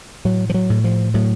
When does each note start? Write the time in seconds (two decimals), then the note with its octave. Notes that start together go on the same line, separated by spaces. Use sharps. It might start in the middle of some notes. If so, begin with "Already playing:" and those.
0.25 A2 F#3
0.50 F3
0.54 F#3
0.70 A2
0.84 F3
1.14 A2 F#3